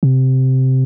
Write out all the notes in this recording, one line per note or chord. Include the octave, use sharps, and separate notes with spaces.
C3